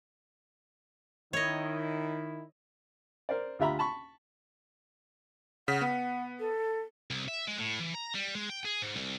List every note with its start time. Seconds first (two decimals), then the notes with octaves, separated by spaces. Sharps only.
1.33 D#3 E4 C#5 D#5
3.29 A#4 C5 D5
3.59 D2 F4 G4 E5 A#5 B5
3.79 A5 B5 C#6
5.68 C#3 F#5 B6
5.81 B3 F#5
6.39 A4
7.10 C2
7.28 E5
7.48 G#3
7.59 A2
7.80 E3
7.94 A#5
8.14 G3
8.35 G#3
8.50 G5
8.65 G#4
8.82 G#2
8.96 C2